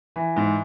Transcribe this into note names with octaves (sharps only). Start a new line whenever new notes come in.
E3
G#2